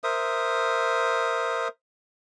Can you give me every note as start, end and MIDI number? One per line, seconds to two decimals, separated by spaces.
0.04 1.68 70
0.04 1.68 72
0.04 1.68 76
0.04 1.68 87